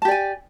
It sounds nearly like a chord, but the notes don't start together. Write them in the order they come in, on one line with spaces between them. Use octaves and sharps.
A5 G4 D5 G#5